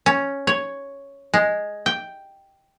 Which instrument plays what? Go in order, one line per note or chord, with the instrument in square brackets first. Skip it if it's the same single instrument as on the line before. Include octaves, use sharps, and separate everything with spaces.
[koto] C#4
C#5
G#3
G5